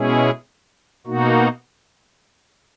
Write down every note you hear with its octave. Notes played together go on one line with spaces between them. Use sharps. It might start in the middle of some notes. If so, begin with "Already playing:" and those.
Already playing: B2 G#3 C#4 E4 G#4
B2 A#3 D#4 F#4